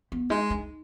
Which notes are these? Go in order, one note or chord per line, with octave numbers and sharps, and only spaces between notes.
B3
G#3 D#4
D#4